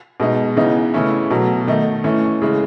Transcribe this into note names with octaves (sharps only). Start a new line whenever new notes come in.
B2 G#3 D#4
C#3 E3 B3 D#4
C#3 E3 A3 C#4 E4
B2 F#3 A3
D#3 A3 D#4
E3 A3 C#4
C#3 E3 G#3